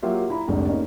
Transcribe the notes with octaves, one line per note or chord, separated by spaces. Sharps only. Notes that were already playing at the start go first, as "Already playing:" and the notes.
F#3 A#3 F4 G4 E5
E4 A#5 B5
F1 C2 G#2 D3
A#3 C#4 D#4